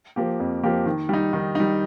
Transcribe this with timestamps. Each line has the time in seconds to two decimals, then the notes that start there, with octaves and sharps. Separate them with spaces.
0.16 F3 A#3 G4
0.39 F2
0.64 F3 A#3 G4
0.86 D#3
1.09 G3 D#4
1.33 D#3
1.55 G3 D#4